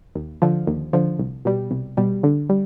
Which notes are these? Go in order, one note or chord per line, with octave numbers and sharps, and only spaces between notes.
D#2
D3 F3
D#2
D3 F3
C2
B2 G3
C2
B2 G3
D3
G3